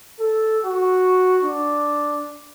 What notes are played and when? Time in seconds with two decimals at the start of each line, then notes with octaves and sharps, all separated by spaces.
0.19 A4
0.65 F#4
1.44 D4